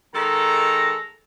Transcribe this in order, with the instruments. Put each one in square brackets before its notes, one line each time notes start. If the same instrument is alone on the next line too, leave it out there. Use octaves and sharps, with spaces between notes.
[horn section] D#3 G#3 A4 A#5